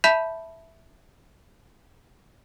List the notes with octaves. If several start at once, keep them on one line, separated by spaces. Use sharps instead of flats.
E5 A5 B5 G6 B6 E7